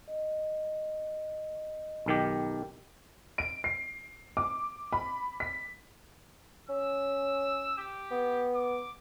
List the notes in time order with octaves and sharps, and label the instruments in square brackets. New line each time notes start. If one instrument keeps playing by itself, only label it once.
[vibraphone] D#5
[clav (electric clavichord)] B1 D#3 G4
[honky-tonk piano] D7
C7
D6
B5
B6
[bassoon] C#4 [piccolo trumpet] E6
[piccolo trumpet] G4
[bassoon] B3
[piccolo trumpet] D6